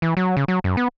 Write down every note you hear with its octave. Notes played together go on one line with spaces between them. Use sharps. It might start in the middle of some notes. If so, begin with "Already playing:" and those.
E3
F#3
C#3
F#3
F#2
B3